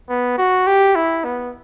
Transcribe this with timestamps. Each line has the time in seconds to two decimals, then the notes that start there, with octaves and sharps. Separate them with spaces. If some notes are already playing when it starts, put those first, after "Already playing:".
0.10 B3
0.38 F#4
0.67 G4
0.96 E4
1.25 B3